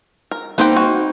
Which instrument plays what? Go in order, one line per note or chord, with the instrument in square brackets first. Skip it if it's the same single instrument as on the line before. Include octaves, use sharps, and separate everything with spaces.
[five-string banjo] A#4
[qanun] A#3 C4 D#4 [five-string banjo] B4 C5 G5
[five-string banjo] F#4